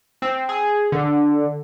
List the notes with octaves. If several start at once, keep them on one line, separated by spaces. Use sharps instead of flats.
C4
G#4
D3